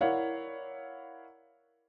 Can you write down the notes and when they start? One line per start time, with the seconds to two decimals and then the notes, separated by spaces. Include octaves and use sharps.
0.01 E4 A#4 C#5 D5 F5 F#5